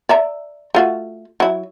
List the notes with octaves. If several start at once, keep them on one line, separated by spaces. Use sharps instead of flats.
D5 E5 A#5
A3 F4 F#4
F#3 E4